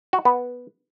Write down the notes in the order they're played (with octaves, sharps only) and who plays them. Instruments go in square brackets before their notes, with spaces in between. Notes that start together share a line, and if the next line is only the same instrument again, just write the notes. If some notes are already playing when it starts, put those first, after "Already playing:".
[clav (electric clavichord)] F#4
B3